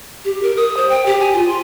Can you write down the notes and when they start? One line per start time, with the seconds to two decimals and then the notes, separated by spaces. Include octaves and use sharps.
0.25 G4
0.43 A#4
0.57 D#6
0.77 C5
0.89 G5
1.06 G4
1.20 G#5
1.34 F4
1.48 C6